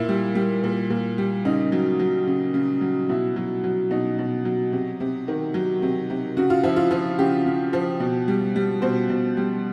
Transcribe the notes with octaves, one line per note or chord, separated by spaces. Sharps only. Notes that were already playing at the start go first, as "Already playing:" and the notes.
Already playing: A#2 E4
G3
G3
A#2
A#2
G3
C#3 D#4
F#3
F#3
C#3
C#3
F#3
B2 E4
F#3
F#3
B2 D#4
B2
F#3
C3
C3
D#3
F#3
C3
C3
C#3 F#4
F4
F3 E4
F4
F3
C#3 G4
C#3
F3
B2
G3
G3
B2 C5
B2
G3